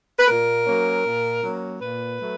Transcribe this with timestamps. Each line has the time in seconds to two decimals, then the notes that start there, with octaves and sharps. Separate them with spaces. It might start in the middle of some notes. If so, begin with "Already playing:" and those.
0.18 B4
0.28 A#2 A#4
0.67 F#3 A#3 C#4
1.05 A#2
1.43 F#3 A#3 C#4
1.82 A#2 B4
2.21 F#3 A3